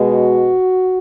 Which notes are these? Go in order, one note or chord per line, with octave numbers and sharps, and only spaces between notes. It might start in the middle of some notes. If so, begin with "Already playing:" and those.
Already playing: B2 G#3
F#4